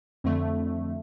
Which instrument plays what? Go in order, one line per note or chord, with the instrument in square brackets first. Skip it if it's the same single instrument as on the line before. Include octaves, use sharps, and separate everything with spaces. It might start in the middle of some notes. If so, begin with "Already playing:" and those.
[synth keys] F2 D3 A3